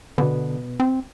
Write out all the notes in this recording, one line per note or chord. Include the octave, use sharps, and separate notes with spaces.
B2 D3 B3
C4